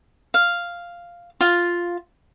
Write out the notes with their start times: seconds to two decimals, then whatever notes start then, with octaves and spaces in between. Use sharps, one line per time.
0.34 F5
1.41 F4